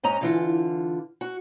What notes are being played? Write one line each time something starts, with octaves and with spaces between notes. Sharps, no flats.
G#2 C#4 D#5 A#5
D3 E3 F4
F#4